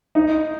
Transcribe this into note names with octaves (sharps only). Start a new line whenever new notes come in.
D#4